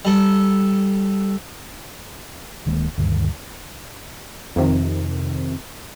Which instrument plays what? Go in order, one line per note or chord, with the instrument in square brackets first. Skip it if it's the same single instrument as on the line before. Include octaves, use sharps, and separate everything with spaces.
[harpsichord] G3 A4
[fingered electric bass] D1 D#3 G#3 A#3
D2 G2 D#3
[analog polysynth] F2 C3 D#3